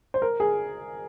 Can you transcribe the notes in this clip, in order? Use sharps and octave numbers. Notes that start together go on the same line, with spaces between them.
C5
A#4
G#4